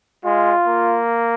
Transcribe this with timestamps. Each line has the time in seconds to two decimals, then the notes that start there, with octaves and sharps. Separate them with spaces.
0.25 G#3 F4
0.67 A#3